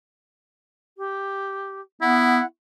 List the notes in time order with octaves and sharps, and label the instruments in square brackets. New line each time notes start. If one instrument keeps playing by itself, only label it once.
[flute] G4
[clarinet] B3 [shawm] E4 [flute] F#5